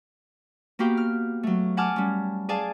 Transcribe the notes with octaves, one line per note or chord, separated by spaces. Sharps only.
A#3 B3 F#4 G4 F5 G5
F6
F#3 A3
F#5 G#5 A5 D6 F6
G3 C#4
G#4 D5 F5 G#5 A5